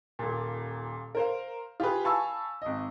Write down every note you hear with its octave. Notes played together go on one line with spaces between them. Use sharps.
D#1 A#2
A#4 C5 F5
F4 G4 G#4 B4
F5 G#5 A5 B5 C#6 E6
G#1 D#5